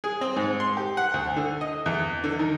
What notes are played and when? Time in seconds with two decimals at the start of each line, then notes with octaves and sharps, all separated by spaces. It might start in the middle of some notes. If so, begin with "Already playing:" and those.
0.04 G#4
0.21 C4
0.36 G#2
0.60 C6
0.77 G4
0.97 F#5
1.14 D2
1.36 D3
1.61 D#5
1.86 E2
2.24 D3
2.39 D#3